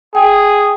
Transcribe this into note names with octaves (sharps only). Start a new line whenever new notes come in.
G#4 G5